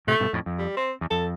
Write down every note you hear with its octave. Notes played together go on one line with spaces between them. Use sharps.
A2 C3 A3
G2 B2
F2 A2
F2
G3
C4
E2
F2 A4